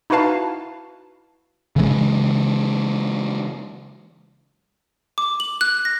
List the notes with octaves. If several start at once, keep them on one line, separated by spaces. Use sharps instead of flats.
D#4 E4 F#4 B4 F5 A5
C#3 E3 G#3
D6
F#7
F#6
A#6